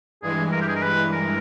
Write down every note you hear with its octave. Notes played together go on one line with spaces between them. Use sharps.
G2 E3 G#3 G#4
A#4
G4
G#4
A#4
B4
A#4